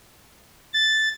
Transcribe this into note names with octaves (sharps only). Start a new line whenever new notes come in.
A6